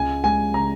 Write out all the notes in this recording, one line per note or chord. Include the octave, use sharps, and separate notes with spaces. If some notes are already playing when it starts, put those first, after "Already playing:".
Already playing: C#2 G#5
G#3 G#5
C#3 A#5